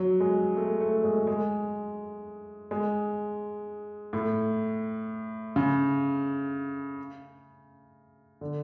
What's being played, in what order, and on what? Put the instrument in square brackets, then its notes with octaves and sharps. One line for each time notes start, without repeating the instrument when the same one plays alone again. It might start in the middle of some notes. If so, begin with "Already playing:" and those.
Already playing: [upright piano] F#3
G#3
A3
A3
G#3
G#3
G#3
A2
C#3
D3